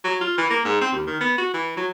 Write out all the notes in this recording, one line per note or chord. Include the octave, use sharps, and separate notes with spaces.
F#3
F4
E3
A#3
G#2
C4
D#2
D#3
B3
F#4
E3
F#3